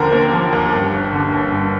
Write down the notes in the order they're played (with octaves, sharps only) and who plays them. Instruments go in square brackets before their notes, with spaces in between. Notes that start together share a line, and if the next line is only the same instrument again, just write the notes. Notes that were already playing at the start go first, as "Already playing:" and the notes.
Already playing: [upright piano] D#2 D3 F3 A#3 A#4 C5
A#3
F3
D#2
G2
G1
D3
G1
G2